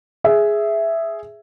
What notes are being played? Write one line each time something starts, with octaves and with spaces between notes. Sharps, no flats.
G#4 E5